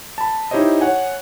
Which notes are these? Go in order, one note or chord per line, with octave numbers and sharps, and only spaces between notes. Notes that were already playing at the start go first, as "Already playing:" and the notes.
A5 B5
D#4 E4 G4 C5 C#5 D#5
C#5 F#5 G#5